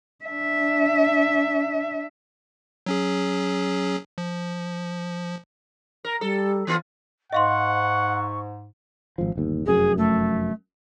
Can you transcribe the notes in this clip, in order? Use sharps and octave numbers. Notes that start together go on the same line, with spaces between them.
D4 E5
F#3 C#4 G#4
F3
A#4
G3 A4
E3 B3 F4
G#2 D#5 F5 F#5 C6 C#6
G#1 F3
G1 D#2
F1 F#2 G#4
A3